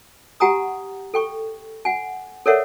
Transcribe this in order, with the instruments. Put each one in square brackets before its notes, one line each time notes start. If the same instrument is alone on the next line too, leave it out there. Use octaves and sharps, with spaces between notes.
[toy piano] G4 F#5 G#5 A#5 D#6
A4 G5 C#6
F#5 G#5
A4 A#4 C#5 D5 E5 F#5